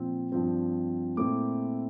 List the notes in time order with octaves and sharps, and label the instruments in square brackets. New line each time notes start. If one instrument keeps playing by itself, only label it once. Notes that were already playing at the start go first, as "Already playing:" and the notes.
Already playing: [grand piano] A#2 F3 C4
G2 F3 C4
A#2 A3 C4 E4 D6